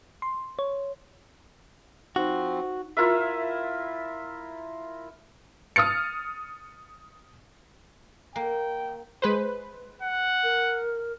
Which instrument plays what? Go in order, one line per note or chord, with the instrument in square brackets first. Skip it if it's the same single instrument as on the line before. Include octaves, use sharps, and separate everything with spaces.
[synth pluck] C6
C#5
[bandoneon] F3 C4 [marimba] D#4 [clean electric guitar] F#4
[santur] E4 F4 A#4 E5
[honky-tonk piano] D#6 F6 A6 C#7
[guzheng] A#3 [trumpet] G5
[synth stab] G#3 B4 C5
[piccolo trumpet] F#5
[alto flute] A#4